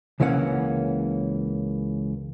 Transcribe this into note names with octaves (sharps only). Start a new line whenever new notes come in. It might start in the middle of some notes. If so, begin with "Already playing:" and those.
C#2 E3 A#3 C#4 F#5